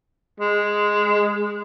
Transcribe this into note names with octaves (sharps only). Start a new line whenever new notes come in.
G#3